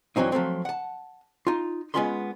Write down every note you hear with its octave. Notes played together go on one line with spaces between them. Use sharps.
G2 E3 F#3 C4 D#4
F3 F#3 A3 C4
F#5 A5
D#4 F4
G#3 B3 C#4 F4 B5 C6